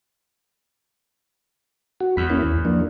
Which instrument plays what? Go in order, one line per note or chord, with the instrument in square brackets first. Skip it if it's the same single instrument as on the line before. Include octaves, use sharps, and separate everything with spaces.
[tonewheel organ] F#4
[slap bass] E2 [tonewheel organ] B5
[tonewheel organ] A#3 C#4 E4
D#2
F3 A#3 D4